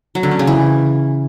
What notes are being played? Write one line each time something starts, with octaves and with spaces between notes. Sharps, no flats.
F#3
D3
C#4
C#3
E3